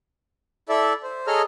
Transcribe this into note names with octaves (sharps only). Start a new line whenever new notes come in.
E4 A4 D5 E5
C5
G#4 A4 C#5 D#5 A#5 F6